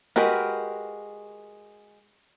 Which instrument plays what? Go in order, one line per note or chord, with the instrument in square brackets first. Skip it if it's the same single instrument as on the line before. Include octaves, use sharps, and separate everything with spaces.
[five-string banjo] G#3 F#4 [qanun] G4 A#4 B4